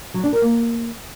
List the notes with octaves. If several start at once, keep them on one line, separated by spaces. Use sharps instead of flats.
F#3
D4
A#4
A#3